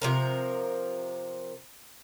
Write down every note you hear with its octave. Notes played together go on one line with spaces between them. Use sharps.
C3 F3 A#4